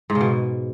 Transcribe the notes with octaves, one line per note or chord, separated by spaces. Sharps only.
G#2
C#3
B2